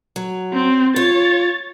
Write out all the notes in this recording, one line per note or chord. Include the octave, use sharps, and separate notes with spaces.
F#3
C4
F4 C#5 A6